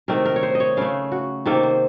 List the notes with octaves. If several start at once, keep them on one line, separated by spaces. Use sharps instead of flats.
C3 D#3 A3 A#4
A#4
C#5
C5
D#5
C#5
C#3 A3 F5
F#4
C3 D#3 A#3 A4
C5